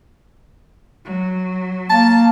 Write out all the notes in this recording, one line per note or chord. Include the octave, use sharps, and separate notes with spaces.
F#3
A#3 A5